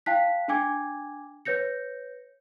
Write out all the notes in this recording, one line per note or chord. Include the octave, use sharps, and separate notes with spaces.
F5 G5 A5 F#6 B6
D4 G5 G#5 D6 G#6
B4 C#5 G6 A#6 C#7